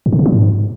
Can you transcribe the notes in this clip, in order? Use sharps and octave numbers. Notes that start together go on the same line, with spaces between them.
G#2
C#3
C3
F#3
G#2